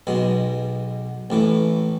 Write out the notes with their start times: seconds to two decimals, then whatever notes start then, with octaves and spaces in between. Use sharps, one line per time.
0.07 B1 B2 G#3
1.30 A1 A2 E3